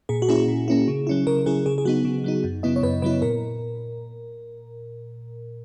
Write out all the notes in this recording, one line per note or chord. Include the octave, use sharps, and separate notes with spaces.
A#2 G#4
F#4
A#3 C#4 E4 G#4
A#2
A#3 C#4 E4
C#3
F#3 C#4 E4
C#3 A#4
F#3 C#4 E4 G#4
C#3 G#4
G#4
F#3 B3 D#4 F#4
C#3
F#3 B3 D#4
F#2
C#3 F#3 B3 E4 D#5
C#5
F#2 B4
C#3 F#3 B3 E4 B4
A#2 A#4